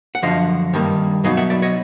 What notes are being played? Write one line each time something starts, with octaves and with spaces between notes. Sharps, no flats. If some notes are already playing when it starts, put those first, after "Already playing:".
F#5
F#2 D3 F3 D#5 F5
G2 D#3 G3 A#3
B2 F#3 B3 D#4 D#5 F5
E5 F#5
D5 E5
C#5 D#5